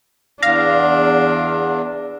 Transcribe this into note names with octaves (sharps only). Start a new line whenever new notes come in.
E2 D4 F5 A#6